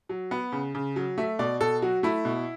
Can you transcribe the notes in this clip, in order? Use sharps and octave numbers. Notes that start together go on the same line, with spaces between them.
F#3
B3
C#3
C#3
F#3
A3 E5
B2 D5
B2 A4
F#3 F#4
A3 E4
B2